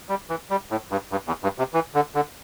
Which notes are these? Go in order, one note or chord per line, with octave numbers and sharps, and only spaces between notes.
G3
E3
G3
A2
G2
G2
E2
G2
C3
E3
D3
D3